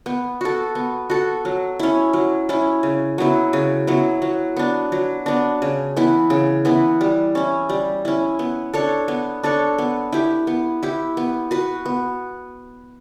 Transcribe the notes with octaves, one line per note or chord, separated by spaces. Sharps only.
B3
F#4 A4
B3
F#4 A4
F#3
C#4 E4
F#3
C#4 E4
C#3
F#3 B3 E4
C#3
F#3 B3 E4
F#3
B3 D4
F#3
B3 D4
C#3
E3 B3 E4
C#3
E3 B3 E4
G3
C#4 E4
G3
C#4 E4
B3
D4 A4 C#5
B3
D4 A4 C#5
B3
E4 G4
B3
E4 G4
B3
F#4 B4
B3